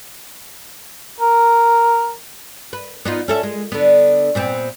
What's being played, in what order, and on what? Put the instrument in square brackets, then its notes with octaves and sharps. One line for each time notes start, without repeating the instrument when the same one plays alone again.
[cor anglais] A#4
[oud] B4
B3 D#4 F4
C#4 A4 E5
G#3
D3 B3
A#2 B3 C4